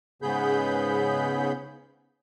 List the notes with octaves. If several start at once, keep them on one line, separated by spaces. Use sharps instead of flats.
G#2 C#3 B3 G#4 B5 G6